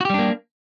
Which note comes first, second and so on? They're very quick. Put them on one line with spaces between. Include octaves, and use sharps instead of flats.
F#4 G4 G3 D4 A#3